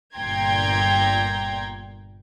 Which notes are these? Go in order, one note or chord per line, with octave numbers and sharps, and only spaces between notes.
G1 A#2 G5 A#5 C6 G#6